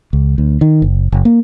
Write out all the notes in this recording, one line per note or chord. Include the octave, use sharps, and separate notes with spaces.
C#2
D2
D#3
F#1
F#1
A#3